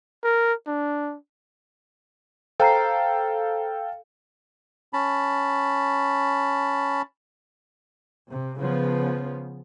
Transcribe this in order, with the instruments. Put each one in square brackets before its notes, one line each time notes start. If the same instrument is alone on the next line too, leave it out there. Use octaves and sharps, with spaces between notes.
[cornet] A#4
D4
[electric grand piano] A4 F5 G5 [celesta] C5 A#5 C7
[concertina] C#4 A5 B5
[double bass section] C3
C#3 F3 B3